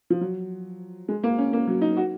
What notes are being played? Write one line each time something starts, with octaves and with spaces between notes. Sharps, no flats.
F3
F#3
G#3
A#3
C#4
A#3
F#3
D#4
F#4